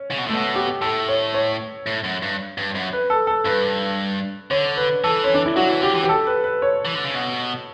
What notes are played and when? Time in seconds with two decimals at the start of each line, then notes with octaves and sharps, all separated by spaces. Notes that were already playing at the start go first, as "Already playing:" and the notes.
Already playing: C#4
0.11 C#3
0.18 B2
0.26 A2
0.29 A3
0.34 B2
0.55 G4
0.81 A2 A4
1.09 C#5
1.34 C#5
1.86 A2
2.04 F#2
2.23 G2
2.58 G2
2.75 F#2
2.93 B4
3.10 A4
3.27 A4
3.45 G2 B4
4.51 D3 C#5
4.77 B4
5.04 E3 A4
5.24 C#4
5.34 D4
5.46 E4
5.56 F#3 F#4
5.69 E3
5.81 D3 G4
5.95 E3
6.03 G4
6.09 A4
6.27 B4
6.44 B4
6.62 C#5
6.85 E3
6.95 D3
7.04 C#3
7.15 B2